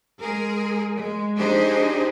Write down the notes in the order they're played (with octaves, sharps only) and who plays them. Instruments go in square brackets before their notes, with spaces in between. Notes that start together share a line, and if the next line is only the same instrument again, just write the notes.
[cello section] G#3 G#4 A#4
G#3
D4 D#4 G4 G#4 C5 D#5